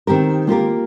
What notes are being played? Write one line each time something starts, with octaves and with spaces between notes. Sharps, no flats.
D#3 C4 G4 A#4
A#3 F4 G4 A#4